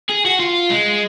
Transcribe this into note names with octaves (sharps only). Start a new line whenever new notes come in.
G#4
F#4
F4
G#3